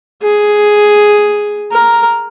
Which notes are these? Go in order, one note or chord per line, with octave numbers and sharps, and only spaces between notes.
G#4
A#4